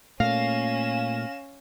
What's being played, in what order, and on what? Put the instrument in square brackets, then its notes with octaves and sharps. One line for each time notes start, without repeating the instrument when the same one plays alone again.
[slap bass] A#2 A3 A#3 [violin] C#4 E7 [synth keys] F5 A#6